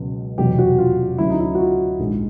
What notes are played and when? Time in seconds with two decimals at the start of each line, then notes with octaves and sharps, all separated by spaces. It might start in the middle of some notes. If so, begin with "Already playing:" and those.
Already playing: C#2 B2 F#3
0.38 F1 E2 B2 F#3 G4
0.59 F#4
0.79 F4
1.18 D2 C#3 F#3 E4
1.30 D#4
1.40 E4
1.55 F#4
1.59 F4
1.99 A#1 G#2 D#3 G#3